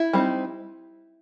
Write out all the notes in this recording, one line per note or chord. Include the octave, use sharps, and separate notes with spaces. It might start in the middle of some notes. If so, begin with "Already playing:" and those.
Already playing: E4
G3 C4 D#4